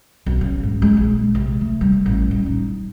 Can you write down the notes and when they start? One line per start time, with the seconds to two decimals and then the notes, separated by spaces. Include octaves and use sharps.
0.26 B1
0.41 C#3
0.63 G#2
0.82 G#3
0.97 A#1
1.35 C3
1.61 A3
1.81 G3
2.06 A1
2.31 G3
2.46 D#4